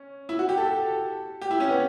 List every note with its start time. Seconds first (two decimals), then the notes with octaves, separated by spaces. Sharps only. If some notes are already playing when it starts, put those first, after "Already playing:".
Already playing: C#4
0.29 E4
0.39 F#4
0.49 G4
0.58 A4
1.42 G4
1.51 E4
1.60 C#4
1.70 B3